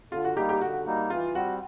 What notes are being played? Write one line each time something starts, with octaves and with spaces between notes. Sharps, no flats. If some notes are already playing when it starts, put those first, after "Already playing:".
D3 F4
F#4
G3 A#3 D#4 G4
G4
D3 F#4
G3 A#3 D#4
E3 F4
G3 C4 F#4